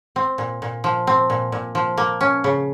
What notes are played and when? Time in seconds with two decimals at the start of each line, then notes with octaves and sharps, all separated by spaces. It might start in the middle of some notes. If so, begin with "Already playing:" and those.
0.16 C4
0.38 A#2
0.62 A#2
0.84 F3
1.07 C4
1.30 A#2
1.52 A#2
1.75 F3
1.98 A#3
2.21 C#4
2.44 C#3